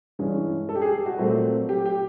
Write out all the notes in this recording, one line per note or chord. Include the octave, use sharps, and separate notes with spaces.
G2 E3 G#3 C#4
A4
G4
G#4
G4
F#4
A#2 F#3 A3 C4
G4
G4